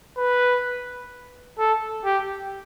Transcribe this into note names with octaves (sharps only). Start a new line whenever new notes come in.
B4
A4
G4